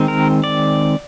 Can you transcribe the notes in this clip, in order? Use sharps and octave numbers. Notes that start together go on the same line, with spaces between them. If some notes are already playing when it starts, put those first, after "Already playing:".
Already playing: D#3 G#3 C4
A#4
D5